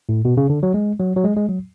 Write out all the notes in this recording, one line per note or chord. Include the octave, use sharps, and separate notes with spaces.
A2
B2
C#3
D3
F#3
G#3
F#3
F#3
G#3
G#3
F#3